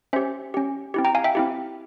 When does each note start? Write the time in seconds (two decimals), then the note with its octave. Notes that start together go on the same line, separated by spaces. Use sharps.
0.13 C#4 G4 C5 E5
0.54 C#4 G4
0.94 C4 E4 G4
1.05 G5 A#5
1.15 F5 G#5
1.24 E5 G5
1.35 C4 E4 G4